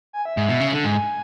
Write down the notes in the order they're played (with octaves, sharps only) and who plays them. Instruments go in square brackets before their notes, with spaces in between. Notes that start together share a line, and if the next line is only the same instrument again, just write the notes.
[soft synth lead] G#5
E5
[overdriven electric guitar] G#2
B2
C#3
D3
[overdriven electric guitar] G#2 [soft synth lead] G#5